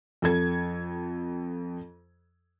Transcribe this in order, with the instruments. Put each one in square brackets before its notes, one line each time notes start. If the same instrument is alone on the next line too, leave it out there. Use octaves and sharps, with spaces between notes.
[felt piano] F2 A4 G#6